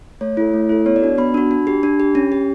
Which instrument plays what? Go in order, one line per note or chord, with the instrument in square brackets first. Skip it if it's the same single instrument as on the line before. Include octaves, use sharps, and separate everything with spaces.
[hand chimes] A3 C#5
E4 A4
A3
E4 A4
B3 C#5
D5
D4 F#4
B3 B5
D4 F#4
D4
G4
D4
G4
C#4
G4